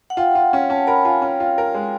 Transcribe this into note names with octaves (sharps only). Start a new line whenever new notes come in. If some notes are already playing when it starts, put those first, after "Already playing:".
F#5
F4 G5
F4
C#4
C#4 A5
A#4 B5
F4 G#5
C#4 G5
F4
A#4
G#3